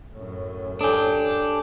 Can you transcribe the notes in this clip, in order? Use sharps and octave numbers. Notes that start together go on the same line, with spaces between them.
F#2 A2
D4 G4 A4 G#5